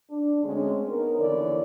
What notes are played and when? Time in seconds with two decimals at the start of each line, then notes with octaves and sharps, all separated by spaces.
0.10 D4
0.44 D2 G#3 C4 C#4
0.88 B3 D#4 A#4
1.19 D#2 D3 E3 C#5 D5